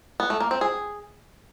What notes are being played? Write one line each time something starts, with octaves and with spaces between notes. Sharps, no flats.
B3
A3
A#3
C4
G#4